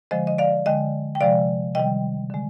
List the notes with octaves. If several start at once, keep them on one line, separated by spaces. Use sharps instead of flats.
D3 F3 G#3 C5 D#5
D#5
D5 F5
D3 G#3 D#5 G5
G5
C3 F3 G#3 D5 F5
C3 D#3 G3 D#5 G5
D3 G#3